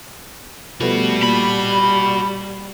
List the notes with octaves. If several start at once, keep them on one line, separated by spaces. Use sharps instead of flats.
F3 G3 A3 B3 F#4 B4
A#2 D5 B5